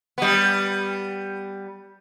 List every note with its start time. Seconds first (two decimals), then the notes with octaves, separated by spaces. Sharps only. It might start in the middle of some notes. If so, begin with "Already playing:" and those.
0.18 G3 B3